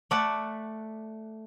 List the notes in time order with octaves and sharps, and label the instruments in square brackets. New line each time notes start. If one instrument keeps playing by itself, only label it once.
[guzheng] A3 D5 E5 F#5 A5